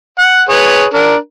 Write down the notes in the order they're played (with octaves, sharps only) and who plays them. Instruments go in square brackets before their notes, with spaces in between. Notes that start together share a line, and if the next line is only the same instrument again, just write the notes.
[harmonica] F#5
G#4 B4 C#5
D4 A#4